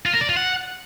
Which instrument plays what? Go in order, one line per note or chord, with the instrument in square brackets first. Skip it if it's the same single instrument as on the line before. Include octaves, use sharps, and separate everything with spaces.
[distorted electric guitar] F4
A#4
D5
F4
F#5